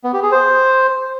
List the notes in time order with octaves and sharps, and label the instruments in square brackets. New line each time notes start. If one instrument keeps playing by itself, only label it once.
[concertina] B3
G4
G#4
C5